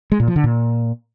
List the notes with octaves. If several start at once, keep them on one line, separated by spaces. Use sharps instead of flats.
G#3
A#2
F3
D3
A#2